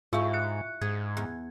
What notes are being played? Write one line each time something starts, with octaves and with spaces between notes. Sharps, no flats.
G#2 E4 F4 G4 F5 C#6
F#6 C#7
G#2 G#4 G#6
E2